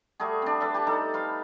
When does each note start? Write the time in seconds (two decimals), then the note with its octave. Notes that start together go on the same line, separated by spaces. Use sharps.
0.20 G3 A3 F#4 G#4
0.42 C4 D4
0.60 A4 B4 D5 E5
0.74 G4 B4 A5
0.87 G3 D#4 A4
1.14 B4 C5 F5